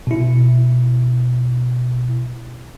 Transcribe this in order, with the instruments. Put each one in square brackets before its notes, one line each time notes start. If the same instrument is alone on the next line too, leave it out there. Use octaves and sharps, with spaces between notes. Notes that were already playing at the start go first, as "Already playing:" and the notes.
[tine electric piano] B2 E4